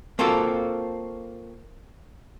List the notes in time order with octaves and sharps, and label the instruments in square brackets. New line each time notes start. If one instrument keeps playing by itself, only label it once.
[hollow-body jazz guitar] A#3 C4 F4 F#4 A4